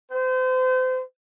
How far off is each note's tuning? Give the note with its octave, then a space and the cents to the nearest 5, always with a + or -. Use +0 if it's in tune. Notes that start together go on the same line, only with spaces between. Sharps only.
C5 -35